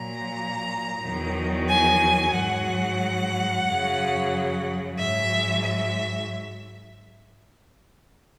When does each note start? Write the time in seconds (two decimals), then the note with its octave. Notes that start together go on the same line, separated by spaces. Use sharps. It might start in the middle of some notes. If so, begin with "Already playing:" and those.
Already playing: A#2 F#3 A#5
1.02 E2 D#3 F#3
1.68 G#5
2.34 G#2 F#3 F#5
3.66 F#2 C#3 F#3
4.97 G#2 F#3 E5
5.63 E5